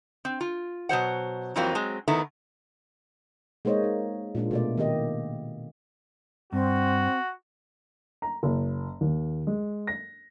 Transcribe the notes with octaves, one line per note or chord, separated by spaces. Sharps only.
C4
F4
B2 F#3 C5 F#5
F2 E3 F#3 A#3 C4 F4
F#3 G#3 C4
E2 D#3 A3 B3 E4
G#3 A#3 D#4 C5 C#5 D#5
D#4
A#2 G#3 A#3 D4 F4
B2 A3 D5
D#3 A#3 G4 D#5
G2 C4 F#4
A#5
F#1
D#2
G#3
A#6